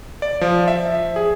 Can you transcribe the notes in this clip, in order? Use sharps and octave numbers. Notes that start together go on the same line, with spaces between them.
D5
F3
E5
G#4